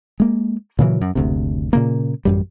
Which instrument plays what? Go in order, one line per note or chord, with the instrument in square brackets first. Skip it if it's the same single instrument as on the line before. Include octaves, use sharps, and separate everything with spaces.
[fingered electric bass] G#3 A#3
A#2 C#3 E3 F#3
F#2
F#1 D2 C3
A#2 C#3 A#3
A1 F#2 G3